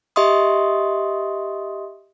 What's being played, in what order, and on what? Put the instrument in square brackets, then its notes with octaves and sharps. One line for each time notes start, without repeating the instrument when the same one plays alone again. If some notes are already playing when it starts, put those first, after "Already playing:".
[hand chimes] G4 D#5 E5 C6 C#6 D#6